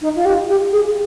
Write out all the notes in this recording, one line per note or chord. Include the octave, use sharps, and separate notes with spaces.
D#4
F4
G4
G4
G#4